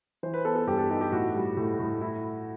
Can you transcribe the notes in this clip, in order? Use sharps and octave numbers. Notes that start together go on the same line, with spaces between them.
E3 C5
B4
B3 A4
A4
G2 G4
A4
D#4 G4
G4
A2 F#4
G3
A2
A2
E4